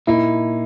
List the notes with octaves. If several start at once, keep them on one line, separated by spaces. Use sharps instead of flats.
A#2 A#3 D#4 E4